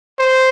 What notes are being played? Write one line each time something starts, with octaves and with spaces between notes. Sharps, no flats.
C5